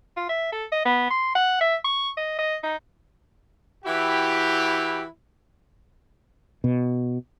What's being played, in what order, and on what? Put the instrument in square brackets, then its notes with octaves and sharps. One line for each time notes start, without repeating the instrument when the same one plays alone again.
[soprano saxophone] F4
E5
A4
D#5
B3
C6
F#5
E5
C#6
D#5
D#5
D#4
[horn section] E3 E4 F#4 G4
[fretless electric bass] B2